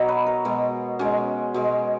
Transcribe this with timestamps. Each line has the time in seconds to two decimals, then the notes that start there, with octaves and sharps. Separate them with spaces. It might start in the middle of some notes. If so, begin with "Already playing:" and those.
Already playing: B2 F#3 C#5 D#5
0.09 B4
0.26 A#4
0.45 B2 G#3
0.99 B2 G#3 C#4
1.54 B2 G#3